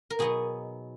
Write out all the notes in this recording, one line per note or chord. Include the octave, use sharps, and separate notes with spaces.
A#4
B2 F#3 B3 D#4 G#4